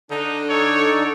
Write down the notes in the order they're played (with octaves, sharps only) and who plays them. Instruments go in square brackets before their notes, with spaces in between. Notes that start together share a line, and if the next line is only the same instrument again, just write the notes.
[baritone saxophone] D3 [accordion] D4 [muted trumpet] D#4
[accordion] D#4 A4 D5 [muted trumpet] C#5